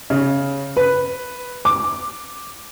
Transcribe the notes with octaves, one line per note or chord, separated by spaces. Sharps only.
C#3
B4
D6